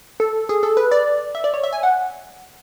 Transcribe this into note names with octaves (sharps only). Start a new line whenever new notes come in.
A4
G#4
A4
B4
D5
E5
D5
C#5
E5
G#5
F#5